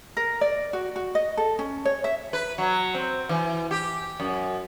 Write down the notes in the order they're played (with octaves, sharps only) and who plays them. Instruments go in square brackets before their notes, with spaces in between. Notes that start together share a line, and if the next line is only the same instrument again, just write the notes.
[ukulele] A#4
D5
F#4
F#4
D#5
A4
C#4
C#5
E5
[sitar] B4
F#3
C4
E3
G4
F#2